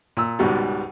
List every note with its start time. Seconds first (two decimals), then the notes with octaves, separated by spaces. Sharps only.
0.17 A#2 E6
0.39 C#2 G#2 B2 G3